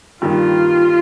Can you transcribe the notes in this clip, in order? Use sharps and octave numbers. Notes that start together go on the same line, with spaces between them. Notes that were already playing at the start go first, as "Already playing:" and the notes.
G2 D#3 G3 A#3 D#4 F4